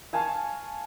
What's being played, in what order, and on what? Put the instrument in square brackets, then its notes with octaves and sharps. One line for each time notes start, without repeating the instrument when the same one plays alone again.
[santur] F5 G#5 A5 C#6